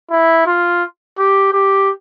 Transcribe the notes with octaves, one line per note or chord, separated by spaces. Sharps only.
E4
F4
G4
G4